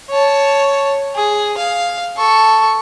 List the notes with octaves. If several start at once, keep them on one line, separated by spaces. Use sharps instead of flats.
C#5 A5
G#4
F5
A4 C#6